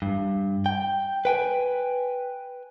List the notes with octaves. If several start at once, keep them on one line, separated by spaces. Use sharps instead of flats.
G2
G5
B4 G5 G#5